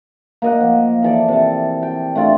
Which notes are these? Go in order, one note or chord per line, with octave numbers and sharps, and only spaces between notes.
A#3 D#5 F#5
F3
E3 A4 D5
C3 A5
G5
A3 D4 F4 D5